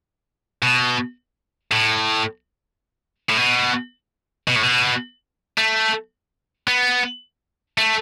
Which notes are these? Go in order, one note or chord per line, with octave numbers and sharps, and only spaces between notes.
B2
A2
A2
B2
B2
A2
B2
A3
B3
A3